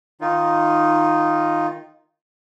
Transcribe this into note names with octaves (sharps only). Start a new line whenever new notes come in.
D#3 D#4 F4